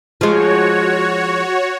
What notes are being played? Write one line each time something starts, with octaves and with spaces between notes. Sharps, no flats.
F3 G#3 F#4 C#5